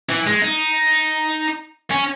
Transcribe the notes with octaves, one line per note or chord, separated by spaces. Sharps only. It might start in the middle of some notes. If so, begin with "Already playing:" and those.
E3
G#3
D#4
C#4